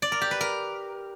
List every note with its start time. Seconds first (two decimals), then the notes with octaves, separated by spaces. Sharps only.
0.02 D5
0.12 A#4
0.21 G4
0.31 B4
0.41 A#4